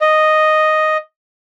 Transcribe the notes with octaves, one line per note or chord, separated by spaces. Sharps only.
D#5